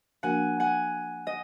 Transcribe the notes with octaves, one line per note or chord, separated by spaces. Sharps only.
F3 A#3 D4 F#4 A#4 F#5 G#5
F#5 G#5
D#5